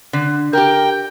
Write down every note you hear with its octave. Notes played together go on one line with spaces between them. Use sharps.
D3
G4 A#4 G5